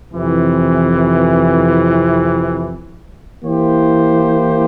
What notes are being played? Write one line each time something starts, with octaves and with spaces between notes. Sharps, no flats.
F2 C3 E3
E3 A#3 E4 G4 C5